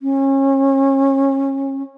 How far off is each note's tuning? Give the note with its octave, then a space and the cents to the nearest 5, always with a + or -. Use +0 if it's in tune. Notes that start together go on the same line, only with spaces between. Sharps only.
C#4 -30